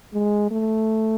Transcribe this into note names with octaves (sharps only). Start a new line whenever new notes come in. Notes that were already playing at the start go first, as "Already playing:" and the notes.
G#3
A3